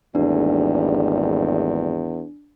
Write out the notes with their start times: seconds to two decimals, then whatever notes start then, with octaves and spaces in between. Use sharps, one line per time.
0.15 G#1 E2 D3 G3 A3 D4